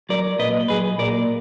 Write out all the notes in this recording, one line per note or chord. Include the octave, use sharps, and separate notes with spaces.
F#3 A#4 D5
A#2 B4 D#5
F#3 G#4 B4
A#2 A#4 D5